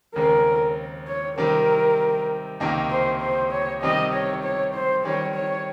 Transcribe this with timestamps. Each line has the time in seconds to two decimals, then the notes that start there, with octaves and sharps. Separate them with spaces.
0.15 D#2 C#3 G#3 C4 A#4
1.07 C#5
1.38 C3 D#3 G3 C4 A#4
2.60 C#2 C3 D#3 A#3 D#4
2.90 C5
3.21 C5
3.52 C#5
3.82 C3 D#3 G3 C4 D#5
4.13 C#5
4.44 C#5
4.74 C5
5.05 D#3 G3 C4 C#5
5.35 C#5